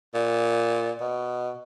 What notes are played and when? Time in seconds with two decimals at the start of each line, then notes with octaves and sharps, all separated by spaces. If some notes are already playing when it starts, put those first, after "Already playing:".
0.14 A#2
1.00 B2